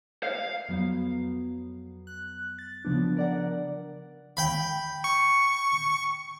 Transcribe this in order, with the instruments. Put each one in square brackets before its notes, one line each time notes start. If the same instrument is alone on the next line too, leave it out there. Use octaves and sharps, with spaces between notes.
[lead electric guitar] F5
[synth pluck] F2 F#3 B3
F#6
A6
C#3 F3 B3 D4
A#4 D5 F#5
[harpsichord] G5 B5
[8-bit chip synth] C#6